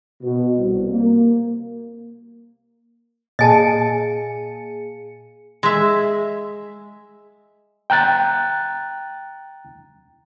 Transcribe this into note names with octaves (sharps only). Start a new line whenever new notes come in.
B2
C2
A#3
A#2 G#4 D#5 G#5 A5 C#7
G#3 E5
G5 A#5 F#6 A6